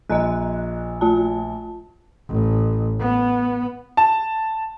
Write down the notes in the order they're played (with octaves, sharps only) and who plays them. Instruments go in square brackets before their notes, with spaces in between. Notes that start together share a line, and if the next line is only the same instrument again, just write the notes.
[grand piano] A#1 [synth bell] D#5 A#5 F#6
[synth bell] A3 F4 A5
[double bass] A1
B3
[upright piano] A5